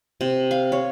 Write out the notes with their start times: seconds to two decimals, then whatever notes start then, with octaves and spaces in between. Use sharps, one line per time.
0.21 C3
0.51 F5
0.72 C#5